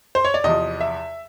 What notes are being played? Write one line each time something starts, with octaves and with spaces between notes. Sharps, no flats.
C5
C#5
D5
E2 C3 F3 D#5
E5